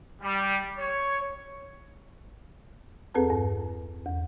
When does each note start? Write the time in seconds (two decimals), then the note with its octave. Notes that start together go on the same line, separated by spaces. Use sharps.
0.22 G3
0.78 C#5
3.14 E2 C4 G#4 A4 B4 A5
3.30 G2
4.06 E2